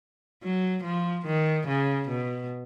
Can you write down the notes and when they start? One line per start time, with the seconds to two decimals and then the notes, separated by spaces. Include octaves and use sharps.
0.43 F#3
0.84 F3
1.26 D#3
1.68 C#3
2.09 B2